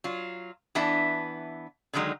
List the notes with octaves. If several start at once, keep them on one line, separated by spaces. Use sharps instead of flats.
F#3 F4
E3 B3 D4 E5 A5
D3 D#3 F#3 G#3 D#4